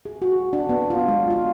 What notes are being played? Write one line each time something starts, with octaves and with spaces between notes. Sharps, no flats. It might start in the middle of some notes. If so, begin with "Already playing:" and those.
G#4
F#4
D4
B3
F4
G#3
F4